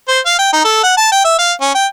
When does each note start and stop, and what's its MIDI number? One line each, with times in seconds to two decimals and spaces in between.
0.08 0.19 72
0.26 0.37 77
0.39 0.50 79
0.53 0.63 63
0.65 0.83 69
0.84 0.96 78
0.97 1.09 81
1.12 1.21 79
1.25 1.36 76
1.39 1.52 77
1.61 1.71 61
1.75 1.86 79